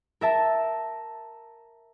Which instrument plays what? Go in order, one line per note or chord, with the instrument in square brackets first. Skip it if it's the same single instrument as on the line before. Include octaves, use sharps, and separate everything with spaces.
[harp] A#4 E5 A5